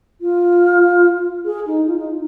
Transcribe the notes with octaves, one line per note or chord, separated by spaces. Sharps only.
F4
G#4
D#4
F4
D#4